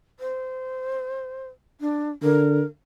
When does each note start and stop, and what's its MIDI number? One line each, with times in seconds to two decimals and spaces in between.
0.20 1.47 72
1.81 2.09 62
2.23 2.63 50
2.23 2.65 70